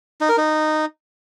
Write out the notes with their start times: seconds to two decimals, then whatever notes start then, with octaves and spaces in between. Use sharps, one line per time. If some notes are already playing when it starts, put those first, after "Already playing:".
0.21 D#4
0.29 A#4
0.37 D#4